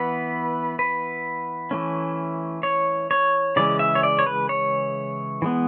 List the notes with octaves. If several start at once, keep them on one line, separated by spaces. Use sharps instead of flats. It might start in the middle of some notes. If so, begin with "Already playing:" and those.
Already playing: E3 B3 B4
B4
E3 A3 C#4
C#5
C#5
C#3 E3 G#3 D5
E5
C#5
D5
C#5
B4
C#5
E3 G#3 B3